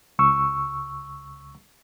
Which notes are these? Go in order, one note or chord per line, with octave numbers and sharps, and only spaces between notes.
C#2 C#6 E6